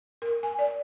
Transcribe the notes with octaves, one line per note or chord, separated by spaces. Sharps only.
A#4
G#5
D5